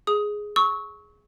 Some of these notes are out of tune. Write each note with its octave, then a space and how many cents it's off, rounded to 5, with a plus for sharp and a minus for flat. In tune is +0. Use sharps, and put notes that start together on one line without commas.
G#4 +0 D#6 +10
C#6 +0 E6 -35